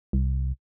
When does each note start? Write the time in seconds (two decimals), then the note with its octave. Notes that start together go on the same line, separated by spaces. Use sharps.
0.13 C2